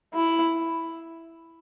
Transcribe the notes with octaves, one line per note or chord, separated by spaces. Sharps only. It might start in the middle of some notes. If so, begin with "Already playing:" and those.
E4